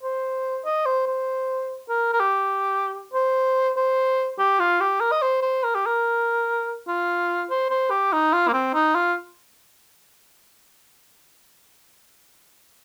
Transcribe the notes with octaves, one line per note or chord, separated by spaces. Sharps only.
C5
D#5
C5
C5
A#4
A#4
G4
C5
C5
G4
F4
G4
A#4
D#5
C5
C5
A#4
G4
A#4
F4
C5
C5
G4
D#4
F4
A#3
C4
D#4
F4